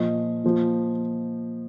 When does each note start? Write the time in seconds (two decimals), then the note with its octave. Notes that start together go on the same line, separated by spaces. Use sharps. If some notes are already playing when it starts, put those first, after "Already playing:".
Already playing: A#2 F3 D#5
0.44 A#2 F3